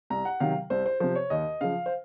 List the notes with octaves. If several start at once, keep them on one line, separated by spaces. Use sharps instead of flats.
C2 A#5
F#5
C3 D#3 F#3 F5
C2 C5
C5
C3 F3 C5
C#5
D#2 D#5
C#3 F3 F5
C5